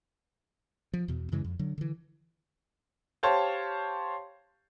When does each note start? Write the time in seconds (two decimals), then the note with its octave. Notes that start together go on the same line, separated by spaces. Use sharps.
0.93 F3
1.08 E2 B2
1.32 F#2 C#3 E3 G#3
1.44 F2
1.59 D3 F#3
1.78 D3 E3
3.23 G4 C5 C#5 F5 A5